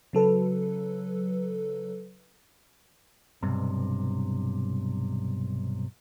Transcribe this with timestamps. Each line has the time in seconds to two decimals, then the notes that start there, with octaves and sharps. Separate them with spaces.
0.13 C#3 F#3 A4 B4
3.43 B1 G2 C3